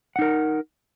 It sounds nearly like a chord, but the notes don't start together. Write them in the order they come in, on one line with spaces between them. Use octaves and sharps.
F#5 D#4 A#4